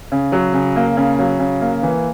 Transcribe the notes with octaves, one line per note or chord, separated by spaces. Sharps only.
C#3
F#3
C#3
A#3
C#3
F#3
C#3
A#3
E3